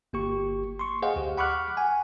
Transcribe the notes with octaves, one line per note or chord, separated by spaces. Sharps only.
G1 A#3 G4 C#6
C6 C#6
G#4 C5 D#5 F5 F#5
D2 G4
F#5 B5 C#6 D6 F6 F#6
F#5 G#5